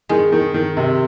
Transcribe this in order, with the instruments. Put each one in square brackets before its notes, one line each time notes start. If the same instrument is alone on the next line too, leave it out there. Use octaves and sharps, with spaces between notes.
[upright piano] D#3 [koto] G#3
[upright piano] D#3
D#3
C3